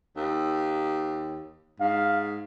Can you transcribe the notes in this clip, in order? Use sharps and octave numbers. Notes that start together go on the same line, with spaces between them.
D#2
G#2 F5